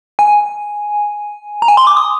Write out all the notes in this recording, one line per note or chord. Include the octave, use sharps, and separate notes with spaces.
G#5
A#5
G#5
C6
D6
D#6